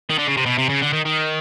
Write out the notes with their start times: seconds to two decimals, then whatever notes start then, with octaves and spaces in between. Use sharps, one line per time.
0.10 D#3
0.19 D3
0.27 C#3
0.37 C3
0.46 B2
0.58 C3
0.69 C#3
0.82 D3
0.93 D#3
1.05 D#3